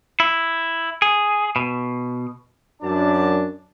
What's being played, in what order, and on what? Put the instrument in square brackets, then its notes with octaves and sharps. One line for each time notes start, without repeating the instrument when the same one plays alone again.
[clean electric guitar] E4
G#4
B2
[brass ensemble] F#2 D4 A5